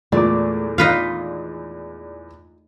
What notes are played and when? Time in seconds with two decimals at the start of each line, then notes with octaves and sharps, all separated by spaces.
0.12 E2 A#2 G#3 A3 D6
0.78 D#4 F4 B4 F5